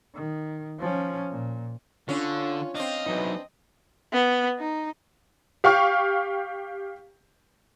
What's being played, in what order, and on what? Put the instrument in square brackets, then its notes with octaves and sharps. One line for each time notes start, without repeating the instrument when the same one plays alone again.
[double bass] D#3
F3 C#4
A#2
[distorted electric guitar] D3 [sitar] C#4 [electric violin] D4 [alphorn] F4
[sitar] C4 D4 [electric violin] D#5 [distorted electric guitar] F5
[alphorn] E3 [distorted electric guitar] F#3 D#4
[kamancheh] B3
D#4
[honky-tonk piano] G4 F5 G5 C#6 F6